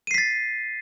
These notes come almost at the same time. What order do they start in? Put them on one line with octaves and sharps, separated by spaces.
D#7 C7 B6 A6